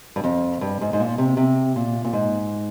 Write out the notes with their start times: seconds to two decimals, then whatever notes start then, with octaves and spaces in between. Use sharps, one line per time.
0.16 G2
0.24 F2
0.61 G2
0.81 G#2
0.93 G#2
1.00 A#2
1.18 C3
1.37 C3
1.76 A#2
2.05 A#2
2.13 G#2